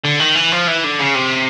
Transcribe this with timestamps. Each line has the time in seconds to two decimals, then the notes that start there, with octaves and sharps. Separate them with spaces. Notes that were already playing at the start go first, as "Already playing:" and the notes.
0.04 D3
0.19 D#3
0.35 E3
0.52 F3
0.67 E3
0.84 D3
0.99 C#3
1.15 C3